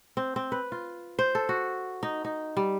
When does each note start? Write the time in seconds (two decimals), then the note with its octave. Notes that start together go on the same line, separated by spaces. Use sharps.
0.17 C4
0.36 C4
0.52 B4
0.72 F4
1.19 C5
1.35 A4
1.49 F#4
2.03 D#4
2.25 D#4
2.57 G3